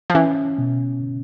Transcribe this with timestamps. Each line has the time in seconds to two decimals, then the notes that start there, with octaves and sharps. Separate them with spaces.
0.10 F3
0.14 E3 C#4
0.58 B2